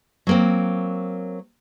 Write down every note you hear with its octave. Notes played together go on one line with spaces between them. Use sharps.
F#3 A#3 C4